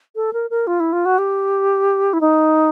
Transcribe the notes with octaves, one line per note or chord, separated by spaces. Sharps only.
A4
A#4
A#4
F4
E4
F4
F#4
G4
E4
D#4